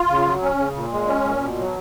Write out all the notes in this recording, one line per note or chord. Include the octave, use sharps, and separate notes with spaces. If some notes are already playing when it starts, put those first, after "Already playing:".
Already playing: F4
C#3
F#3
C#4
C#3
A#2
G#3
C#4
A#2
B2
F#3